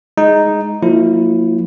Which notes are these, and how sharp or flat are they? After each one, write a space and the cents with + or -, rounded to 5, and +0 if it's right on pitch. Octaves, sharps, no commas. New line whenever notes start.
G#3 +0 D#4 +0
F3 +45 A#3 -15 E4 +0